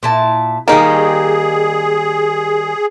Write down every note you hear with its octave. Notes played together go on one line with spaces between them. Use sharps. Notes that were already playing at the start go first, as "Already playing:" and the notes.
A#2 E4 A5
D#3 G3 A#3 D#4 G4 G#4